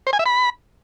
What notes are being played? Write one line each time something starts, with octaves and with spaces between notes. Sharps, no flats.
C5
G#5
E5
B5